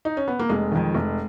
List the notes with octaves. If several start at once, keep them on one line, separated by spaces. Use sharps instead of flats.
D#4
C#4
B3
A#3
F1 G#3
F2 D#3
F1